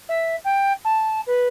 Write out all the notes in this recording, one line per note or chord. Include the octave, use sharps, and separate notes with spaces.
E5
G5
A5
B4